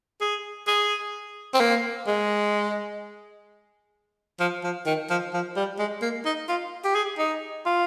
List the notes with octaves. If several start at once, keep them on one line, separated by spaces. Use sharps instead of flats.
G#4
G#4
C4
A#3
G#3
F3
F3
D#3
F3
F3
G3
G#3
A#3
D#4
F4
G4
G#4
D#4
F4